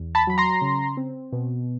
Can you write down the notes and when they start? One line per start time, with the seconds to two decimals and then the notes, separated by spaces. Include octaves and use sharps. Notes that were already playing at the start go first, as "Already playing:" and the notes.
Already playing: E2
0.15 A5 B5
0.27 F#3 B5
0.38 A#5 C6
0.61 C#3
0.97 C4
1.32 B2